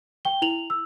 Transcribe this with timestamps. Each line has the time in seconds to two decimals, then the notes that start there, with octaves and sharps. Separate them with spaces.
0.25 G5 G7
0.42 E4 F7 F#7
0.70 E6